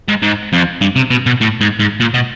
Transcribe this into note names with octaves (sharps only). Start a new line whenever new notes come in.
G#2
G#2
F2
G2
C3
B2
B2
A2
G#2
G#2
A#2
B2